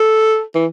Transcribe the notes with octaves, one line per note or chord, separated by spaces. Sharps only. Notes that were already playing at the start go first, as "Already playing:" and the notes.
Already playing: A4
E3